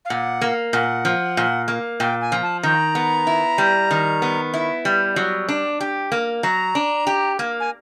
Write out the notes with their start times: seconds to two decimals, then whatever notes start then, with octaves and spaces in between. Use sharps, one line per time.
0.05 F5
0.10 A#2 F#5
0.41 A#3
0.73 A#2 F#5
1.05 F3
1.37 A#2
1.68 A#3
2.00 A#2 G5
2.21 G#5
2.32 F3
2.43 A5
2.63 D#3 A#5
2.95 B3
3.27 E4
3.58 G3
3.91 D#3
4.22 B3
4.54 E4
4.85 G3
5.16 F#3
5.49 D4
5.81 G4
6.12 A#3
6.43 F#3 A#5
6.75 D4
7.07 G4
7.39 A#3
7.60 G#5